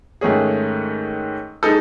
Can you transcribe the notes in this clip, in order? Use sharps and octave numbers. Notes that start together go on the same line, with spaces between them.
G#2 D#3 A3 C#4 G#4
G#3 D#4 A4